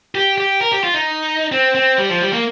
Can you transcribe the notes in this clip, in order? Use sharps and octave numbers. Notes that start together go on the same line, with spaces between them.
G4
G4
A#4
G4
F4
D#4
C4
C4
G3
F3
G3
A#3